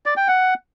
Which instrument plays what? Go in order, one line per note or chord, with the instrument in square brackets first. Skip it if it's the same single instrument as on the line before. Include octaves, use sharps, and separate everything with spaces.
[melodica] D5
G5
F#5